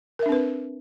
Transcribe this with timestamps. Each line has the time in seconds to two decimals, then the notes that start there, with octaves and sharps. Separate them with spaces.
0.19 A#4
0.23 E5
0.26 D4
0.29 C4
0.32 B4